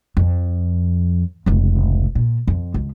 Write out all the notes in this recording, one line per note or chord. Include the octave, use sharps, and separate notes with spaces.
F2
F1 C#2
A#2
F2
C#2